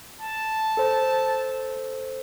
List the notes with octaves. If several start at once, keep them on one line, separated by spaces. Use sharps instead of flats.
A5
A4 C5